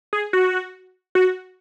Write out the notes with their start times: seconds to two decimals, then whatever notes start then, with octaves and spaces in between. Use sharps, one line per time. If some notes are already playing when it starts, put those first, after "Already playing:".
0.13 G#4
0.33 F#4
1.15 F#4